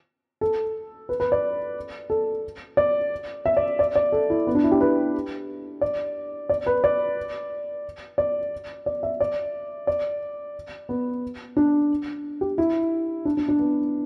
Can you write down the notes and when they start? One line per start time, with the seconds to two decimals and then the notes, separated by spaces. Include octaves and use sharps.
0.41 A4
1.09 B4
1.20 B4
1.32 D5
2.10 A4
2.77 D5
3.46 E5
3.57 D5
3.79 D5
3.95 D5
4.12 A4
4.30 E4
4.47 B3
4.55 D4
4.64 E4
4.72 G4
4.81 B4
5.81 D5
6.49 D5
6.66 B4
6.84 D5
8.18 D5
8.86 D5
9.03 E5
9.20 D5
9.87 D5
10.89 B3
11.57 D4
12.41 G4
12.58 E4
13.25 D4
13.37 D4
13.48 D4
13.59 B3